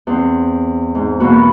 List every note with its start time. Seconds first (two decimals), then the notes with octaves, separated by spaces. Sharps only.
0.07 E2 C4
0.95 G#2
1.20 B2 E3 A#3 B3 F#4